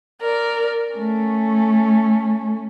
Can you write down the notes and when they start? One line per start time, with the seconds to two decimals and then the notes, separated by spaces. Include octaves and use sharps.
0.20 A#4 D5
0.96 A3 C#4